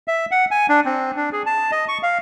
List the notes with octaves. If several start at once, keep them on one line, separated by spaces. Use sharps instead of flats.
E5
F#5
G#5
D4
C4
D4
G#4
A5
D#5
C#6
F5